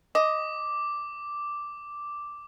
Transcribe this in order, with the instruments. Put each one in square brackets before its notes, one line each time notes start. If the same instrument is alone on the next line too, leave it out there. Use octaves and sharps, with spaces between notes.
[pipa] D#5 [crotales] D6